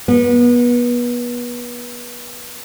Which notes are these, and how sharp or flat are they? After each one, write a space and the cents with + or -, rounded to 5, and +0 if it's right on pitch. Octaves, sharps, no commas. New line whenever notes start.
B3 -30